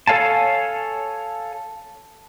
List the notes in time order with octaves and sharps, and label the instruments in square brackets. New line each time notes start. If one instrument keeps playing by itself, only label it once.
[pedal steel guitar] A4 C#5 F5 G#5 A5